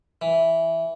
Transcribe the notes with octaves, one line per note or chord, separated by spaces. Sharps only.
E3